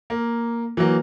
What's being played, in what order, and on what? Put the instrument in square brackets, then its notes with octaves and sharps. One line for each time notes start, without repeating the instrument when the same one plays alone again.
[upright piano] A#3
E3 F#3 A#3